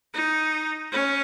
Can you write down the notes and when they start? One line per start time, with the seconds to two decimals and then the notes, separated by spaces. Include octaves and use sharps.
0.14 D#4
0.92 C#4